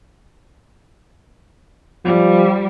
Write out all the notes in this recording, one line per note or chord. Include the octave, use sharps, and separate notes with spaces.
F3 G3